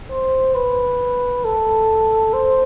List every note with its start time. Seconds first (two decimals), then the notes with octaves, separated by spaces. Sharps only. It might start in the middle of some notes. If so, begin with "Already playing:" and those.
0.11 C5
0.55 B4
1.45 A4
2.33 C5